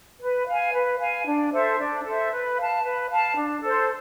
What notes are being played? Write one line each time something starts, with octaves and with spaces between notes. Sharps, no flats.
B4
F5 G#5
B4
F5 G#5
D4
A4 C5 E5
D4
A4 C5 E5
B4
F5 A5
B4
F5 A5
D4
A4 C5